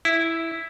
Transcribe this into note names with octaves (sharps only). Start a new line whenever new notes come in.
E4